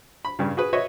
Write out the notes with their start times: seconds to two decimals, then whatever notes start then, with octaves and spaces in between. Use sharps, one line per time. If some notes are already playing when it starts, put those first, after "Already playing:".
0.25 B5
0.39 G2 C#3
0.57 F#4 G#4 B4
0.73 F#4 B4 C#5 D#5 E5